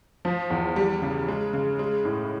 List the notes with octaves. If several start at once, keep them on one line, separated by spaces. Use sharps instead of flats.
F3
E2
G3
C#3
G#3
C#3
G#3
A2